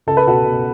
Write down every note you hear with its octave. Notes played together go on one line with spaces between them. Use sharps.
C#2 A4
B4
B2 F#4 A4
B2